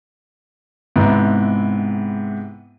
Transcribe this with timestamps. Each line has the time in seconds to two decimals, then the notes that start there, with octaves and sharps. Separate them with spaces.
0.96 G#2 C3 B3 E4